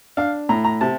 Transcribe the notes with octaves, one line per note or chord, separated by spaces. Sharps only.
D4 F5
A2 A#5
A#5
C3 A5